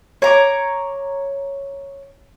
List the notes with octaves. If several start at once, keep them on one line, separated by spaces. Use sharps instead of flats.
C#5 A#5 D6